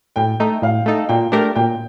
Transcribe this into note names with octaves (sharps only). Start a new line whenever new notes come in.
A2 G5
A3 D#4 A4
A2 F5
A3 D#4 A4
A#2 G5
A3 D4 G4 A#4
A#2 G5